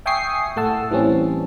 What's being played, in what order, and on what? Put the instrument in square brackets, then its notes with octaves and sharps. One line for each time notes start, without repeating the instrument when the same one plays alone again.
[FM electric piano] E5 G5 G#5 C#6 D#6 C7
A2 A3 F#5 A5 E6
E3 G3 C4 C#4